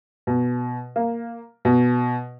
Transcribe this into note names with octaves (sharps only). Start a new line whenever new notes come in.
B2
A#3
B2